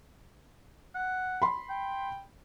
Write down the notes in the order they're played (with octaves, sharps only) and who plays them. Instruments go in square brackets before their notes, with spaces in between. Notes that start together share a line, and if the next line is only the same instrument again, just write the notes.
[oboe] F#5
[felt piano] B5 C6
[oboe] G5